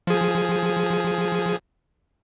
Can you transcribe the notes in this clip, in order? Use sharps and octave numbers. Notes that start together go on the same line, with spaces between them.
F3 G#4